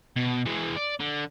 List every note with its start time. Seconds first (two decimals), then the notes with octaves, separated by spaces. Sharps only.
0.16 B2
0.45 E3 G#3
0.76 D5
1.00 D3